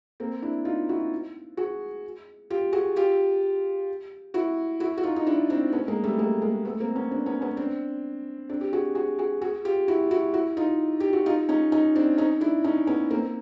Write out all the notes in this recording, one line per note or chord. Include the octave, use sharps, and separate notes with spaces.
A#3 C4
D4 E4
D#4 F4
E4 F#4
F#4 G#4
F4 G4
F#4 G#4
F4 G4
E4 F#4
E4 F#4
F#4
D#4 F4
D#4
D4 E4
C4 D4
B3 C#4
G#3 A#3
G3 A3
G#3 A#3
G#3 A#3
A3 B3
A#3 C4
B3 C#4
C4 D4
B3 C#4
B3 C#4
C4 D4
C4 D4
G4
F#4 G#4
F#4 G#4
F#4 G#4
F#4 G#4
F4 G4
E4 F#4
E4 F#4
E4 F#4
D#4 F4
G4
F#4
D#4 F4
C#4 D#4
C#4 D#4
C4 D4
C#4 D#4
D4 E4
C#4 D#4
B3 C#4
A#3 C4